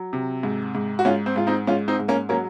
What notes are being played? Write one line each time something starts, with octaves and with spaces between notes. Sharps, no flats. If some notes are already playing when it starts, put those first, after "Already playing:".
Already playing: F#3
C3
G#2
G#2
F#4
G#2 C#4 F4
C4
G#2 F4
C4 D#4
G#2 C#4 F4
C4 D#4
G#2
A#3 C#4
F#3 A#3 C#4